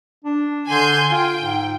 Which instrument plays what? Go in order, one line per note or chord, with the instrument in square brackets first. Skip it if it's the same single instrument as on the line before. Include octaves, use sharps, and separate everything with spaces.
[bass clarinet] D4
[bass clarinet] D3 [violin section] G#5 C6 G6
[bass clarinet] F4 [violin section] G5
[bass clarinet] G#2